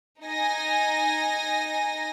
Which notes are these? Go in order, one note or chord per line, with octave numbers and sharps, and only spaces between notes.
D#4 G#5 A#6